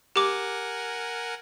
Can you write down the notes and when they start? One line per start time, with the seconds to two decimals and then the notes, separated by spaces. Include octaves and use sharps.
0.16 G4 A#4 F#5 G#5 D6